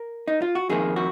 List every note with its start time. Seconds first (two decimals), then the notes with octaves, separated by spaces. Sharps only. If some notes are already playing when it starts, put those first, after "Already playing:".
Already playing: A#4
0.28 D#4
0.42 F4
0.55 F#4
0.69 F2 D#3 A#3 G#4
0.96 F#4